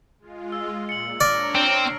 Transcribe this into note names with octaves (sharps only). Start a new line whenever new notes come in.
G#3 F4
E6
A#2 C#7 F#7
D4 C#5 D5 A#5 F6 A#6 D7
C4 A#6